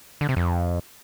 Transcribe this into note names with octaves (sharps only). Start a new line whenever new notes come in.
D3
C3
F2